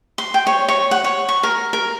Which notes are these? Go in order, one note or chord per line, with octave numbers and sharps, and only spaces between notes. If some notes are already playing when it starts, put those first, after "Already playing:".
C6
G5
C#5
C#5
F#5
C#5
C#6
A#4
A#4